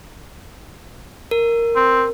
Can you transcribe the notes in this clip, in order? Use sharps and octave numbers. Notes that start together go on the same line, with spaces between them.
A#4
C4